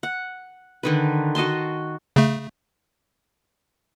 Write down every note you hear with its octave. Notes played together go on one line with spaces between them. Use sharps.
F#5
D3 D#3 B4
F#4 D#5 A5 C6
C#3 A3